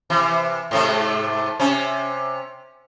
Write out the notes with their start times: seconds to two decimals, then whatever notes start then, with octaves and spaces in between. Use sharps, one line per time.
0.10 C3 E3
0.71 G#2 C3 A3
1.59 C3 C#4